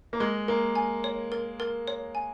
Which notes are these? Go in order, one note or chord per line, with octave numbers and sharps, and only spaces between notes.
A#3
G#3 A#4
A#3 A#4
G#5
C#5
A#4
A#4
C#5
G#5